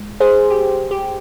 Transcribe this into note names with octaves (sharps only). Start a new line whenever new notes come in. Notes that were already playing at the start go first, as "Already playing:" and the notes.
Already playing: G#3
G#4 C5
G4
G4